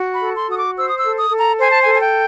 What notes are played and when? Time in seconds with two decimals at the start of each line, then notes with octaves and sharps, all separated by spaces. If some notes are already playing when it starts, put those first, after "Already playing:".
Already playing: F#4
0.14 B5
0.21 A4
0.35 C6
0.48 F#4 D#6
0.55 D6
0.76 C5 E6
0.88 D#6
0.96 E6
1.04 A4
1.17 D#6
1.30 A4
1.38 A#5
1.58 C5 G#5
1.70 A5
1.81 G#5
1.85 A4
1.93 G#5
1.99 G5